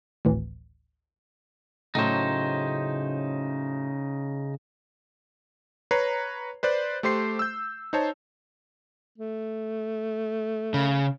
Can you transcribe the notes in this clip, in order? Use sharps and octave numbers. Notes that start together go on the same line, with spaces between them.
G#1 D2 A2 E3
A2 C#3 F#3 D#4 C5
B4 C#5 A#5 C7
B4 C5 D5 F#6
A3 G4 C5 C6 C7
E6 G6
D#4 C5 C#5 A5
A3
C#3